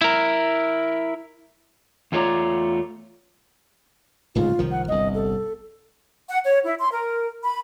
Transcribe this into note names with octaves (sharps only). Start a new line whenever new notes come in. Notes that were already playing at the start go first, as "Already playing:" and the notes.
E4 A#4
E2 A3 F4 C#5 D5 A#5
D1 G#2 C#3 F4
C2 D#3 F3
F#5
G1 C2 D#5
A4
F#5
C#5
E4
C6
A#4
B5